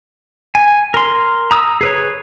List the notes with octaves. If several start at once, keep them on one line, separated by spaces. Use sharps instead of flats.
G#5
A#4 C6
A#5 D#6 E6
G#4 B4 C#5